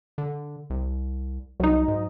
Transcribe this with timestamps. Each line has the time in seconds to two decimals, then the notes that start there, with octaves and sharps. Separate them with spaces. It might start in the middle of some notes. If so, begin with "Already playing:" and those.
0.18 D3
0.70 C2
1.60 C2 F#3 D#4
1.88 G#2